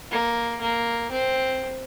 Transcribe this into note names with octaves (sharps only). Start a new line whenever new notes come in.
A#3
A#3
C4